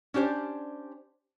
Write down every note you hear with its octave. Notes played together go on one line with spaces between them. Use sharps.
C#4 D4 G4 C5 D5